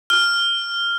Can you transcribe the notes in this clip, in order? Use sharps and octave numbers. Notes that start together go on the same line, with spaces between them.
F6